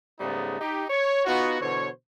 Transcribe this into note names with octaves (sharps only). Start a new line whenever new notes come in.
G#2 C#3 G3 A3 B3 D#4
D#4 G4
C#5
B3 D#4 F4 F#4
B2 D3 E3 C5 C#5